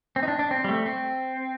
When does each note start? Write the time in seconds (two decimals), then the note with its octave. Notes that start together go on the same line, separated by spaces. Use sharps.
0.16 C4
0.23 D#4
0.28 D4
0.39 D4
0.51 C4
0.64 G3
0.68 A3
0.86 C4